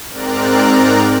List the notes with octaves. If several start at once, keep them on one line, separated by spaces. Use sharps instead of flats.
G#2 C4 A#4 D5 A#5 F#6